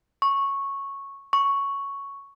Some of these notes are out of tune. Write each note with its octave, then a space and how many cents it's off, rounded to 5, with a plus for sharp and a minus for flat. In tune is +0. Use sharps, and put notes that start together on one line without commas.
C#6 -5
C#6 +5